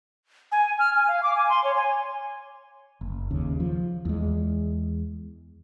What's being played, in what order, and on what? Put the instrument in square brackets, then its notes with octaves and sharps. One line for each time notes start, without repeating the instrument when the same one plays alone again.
[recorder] G#5
F6
G#5
F5
D6
G#5
C6
C#5
G#5
[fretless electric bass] F#1
D#2 C#3
F3
E2 G#3